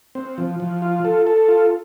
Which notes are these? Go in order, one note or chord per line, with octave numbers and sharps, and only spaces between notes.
C4
F3
F3
F4
A4
A4
F4